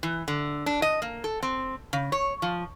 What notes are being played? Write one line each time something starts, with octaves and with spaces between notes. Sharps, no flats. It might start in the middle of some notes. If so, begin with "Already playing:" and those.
E3
D3
D4
D#5
A#3
A4
C4
C#3
C#5
F3